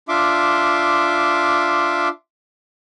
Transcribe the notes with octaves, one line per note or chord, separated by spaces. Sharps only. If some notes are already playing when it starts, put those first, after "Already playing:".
D4 F4 E5 C6 D6